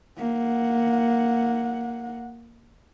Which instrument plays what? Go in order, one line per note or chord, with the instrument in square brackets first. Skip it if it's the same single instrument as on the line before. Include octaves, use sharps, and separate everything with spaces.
[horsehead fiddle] A#3 F#5